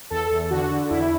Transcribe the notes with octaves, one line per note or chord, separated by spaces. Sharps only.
E2 A4
E2
D3 F#4
D3
E2 E4